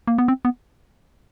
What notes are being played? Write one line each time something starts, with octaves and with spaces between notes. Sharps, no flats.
A#3
B3
C4
B3